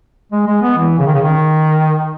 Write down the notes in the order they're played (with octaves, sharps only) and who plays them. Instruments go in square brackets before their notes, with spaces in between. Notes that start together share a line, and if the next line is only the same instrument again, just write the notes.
[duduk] G#3
G#3
B3
E3
C#3
D#3
C#3
D#3